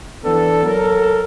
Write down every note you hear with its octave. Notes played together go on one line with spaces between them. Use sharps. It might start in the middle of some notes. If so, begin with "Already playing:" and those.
E3 B3 D4 A4
F#3 A4 A#4